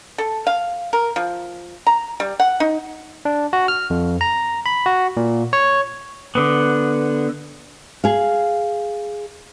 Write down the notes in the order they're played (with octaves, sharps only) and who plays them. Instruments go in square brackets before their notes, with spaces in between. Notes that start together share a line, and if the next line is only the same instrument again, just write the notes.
[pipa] A4
F5
A#4
F3
A#5
G3
F#5
D#4
[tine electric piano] D4
F#4
F6
F2
A#5
B5
F#4
A#2
C#5
[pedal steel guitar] D3 B3
[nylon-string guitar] G#4 F5